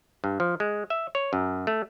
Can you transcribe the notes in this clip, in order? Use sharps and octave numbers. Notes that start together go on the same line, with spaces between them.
G2
F3
G#3
E5
C#5
F#2
A3